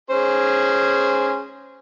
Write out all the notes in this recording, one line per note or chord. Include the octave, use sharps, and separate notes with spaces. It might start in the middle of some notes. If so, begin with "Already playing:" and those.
C#4 G#4 C5